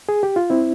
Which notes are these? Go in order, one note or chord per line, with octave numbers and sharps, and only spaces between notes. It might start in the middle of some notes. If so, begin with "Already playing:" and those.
G#4
G4
F4
C4 E4